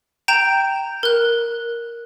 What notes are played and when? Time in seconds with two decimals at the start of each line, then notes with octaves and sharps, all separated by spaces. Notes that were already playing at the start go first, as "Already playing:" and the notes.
0.28 G5 A#5 G6 D7 E7
1.03 A#4 F#6